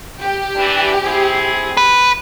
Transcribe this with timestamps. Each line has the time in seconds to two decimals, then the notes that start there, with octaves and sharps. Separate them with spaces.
0.23 G4
0.56 E3 D4
1.02 C4 E4 G#4
1.77 B4